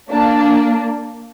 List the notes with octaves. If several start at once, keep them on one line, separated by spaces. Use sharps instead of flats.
A#3 D4